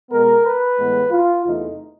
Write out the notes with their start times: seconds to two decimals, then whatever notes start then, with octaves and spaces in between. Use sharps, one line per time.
0.10 B2 G#3 B3 A#4
0.45 B4
0.79 A2 E3 G#3 B3
1.11 F4
1.45 E2 C3 E3 A3 D#4